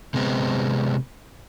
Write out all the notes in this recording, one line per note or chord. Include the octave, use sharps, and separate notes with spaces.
C3 G#3 B3 C4